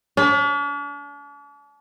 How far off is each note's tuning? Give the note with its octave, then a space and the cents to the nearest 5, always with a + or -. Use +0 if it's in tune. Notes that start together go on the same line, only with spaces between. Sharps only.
D4 -45